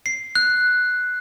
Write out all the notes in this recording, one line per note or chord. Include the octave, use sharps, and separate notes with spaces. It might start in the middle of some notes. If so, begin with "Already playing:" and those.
C7
F#6